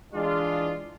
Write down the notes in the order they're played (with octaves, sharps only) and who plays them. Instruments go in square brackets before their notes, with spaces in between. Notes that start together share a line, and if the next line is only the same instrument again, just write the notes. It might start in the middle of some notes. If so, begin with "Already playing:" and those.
[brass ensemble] E3 G#3 D4 F4